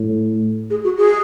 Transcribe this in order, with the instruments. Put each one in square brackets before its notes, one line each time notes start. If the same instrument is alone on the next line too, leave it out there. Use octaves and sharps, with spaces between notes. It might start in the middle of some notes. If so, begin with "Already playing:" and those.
Already playing: [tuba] A2
[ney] G#4
F#4
G#4